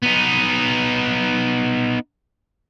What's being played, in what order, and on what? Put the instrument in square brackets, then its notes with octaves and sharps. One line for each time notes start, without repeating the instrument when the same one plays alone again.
[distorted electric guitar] B3 D#4